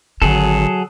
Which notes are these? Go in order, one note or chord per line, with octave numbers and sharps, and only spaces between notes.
G#1 D3 F#3 G#4 A4